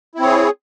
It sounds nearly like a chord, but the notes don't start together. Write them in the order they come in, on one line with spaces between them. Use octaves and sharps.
E4 C4 C#5 G#4